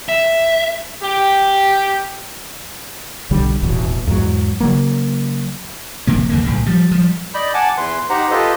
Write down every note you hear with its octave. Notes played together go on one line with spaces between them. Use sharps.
E5
G4
B1 D3 G3
D#1 A1 E2 B2
E2 G#2 F#3
C#3 F#3 A#3
F1 C3 A#3
E2 D3 A#3
B1 A2 C#3
F3 G3
F3 G3
D5 D#5 B5 G6
F#5 G#5 A5 D6
E2 E3 B4 C6
D#4 G4 C5 F#5 A#5
F4 G4 A4 B4 C5 D#5